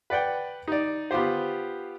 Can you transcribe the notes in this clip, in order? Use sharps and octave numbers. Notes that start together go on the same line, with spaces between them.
B4 D5 F#5 G5
D#4 D5
B3 F4 G4 C5